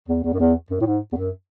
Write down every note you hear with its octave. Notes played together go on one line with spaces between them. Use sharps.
E2
E2
F#2
E2
F#2
A2
G#2
E2
F#2